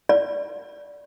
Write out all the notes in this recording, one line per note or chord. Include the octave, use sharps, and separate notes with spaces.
D5